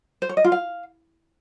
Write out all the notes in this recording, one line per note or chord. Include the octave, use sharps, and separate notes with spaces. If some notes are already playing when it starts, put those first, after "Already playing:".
C5
C#5
D#5
F4
F5